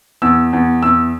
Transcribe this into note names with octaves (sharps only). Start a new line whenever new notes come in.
E2 E6
E2
E2 E6